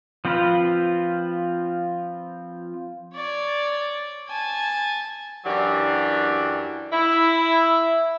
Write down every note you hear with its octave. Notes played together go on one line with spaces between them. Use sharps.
F3 C4 F4 B4
C#5 D5
G#5 A5
F#2 E3 F#3 D4 G4
E4